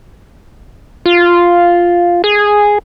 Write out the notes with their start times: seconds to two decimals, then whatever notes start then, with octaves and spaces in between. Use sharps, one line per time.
1.06 F4
2.24 G#4